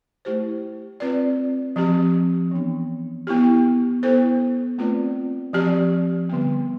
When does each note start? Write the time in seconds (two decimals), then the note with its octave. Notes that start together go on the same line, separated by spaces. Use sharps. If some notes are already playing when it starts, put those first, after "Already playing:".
0.25 A3 E4 G4 C5
1.00 C4 F4 B4 D5
1.76 F3 C4 G4
2.51 E3 B3 D4
3.27 B3 E4 G4
4.03 B3 E4 A4 C5
4.78 A3 C4 F4 B4 D5
5.53 F3 C4 G4 D5
6.29 D3 G3 B3